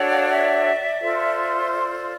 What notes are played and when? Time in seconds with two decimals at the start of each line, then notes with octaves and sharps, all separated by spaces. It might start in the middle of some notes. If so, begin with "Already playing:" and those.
Already playing: D4 F#4 A4 C#5
0.10 D#5 F5
0.28 D5 E5
1.00 F4 A4 C5
1.70 D5